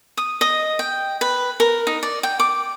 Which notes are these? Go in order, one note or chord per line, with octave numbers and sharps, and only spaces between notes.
D#6
D#5
G5
B4
A#4
D#4
D5
G5
D6